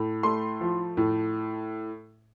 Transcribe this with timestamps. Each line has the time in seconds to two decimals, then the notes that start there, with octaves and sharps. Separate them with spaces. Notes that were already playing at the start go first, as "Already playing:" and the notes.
Already playing: A2
0.23 A3 C6
0.61 F3
0.97 A2